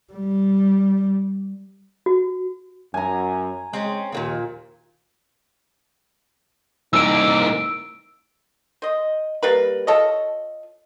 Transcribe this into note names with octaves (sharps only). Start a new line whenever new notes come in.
G3
F#4
F#2 G#5 A#5
G#3 C4 C#4
D#2 A#2 D3 F3
C2 A#3 D#4 E6 D7
C5 D#5
G3 A#3 B4
F4 A4 C#5 D#5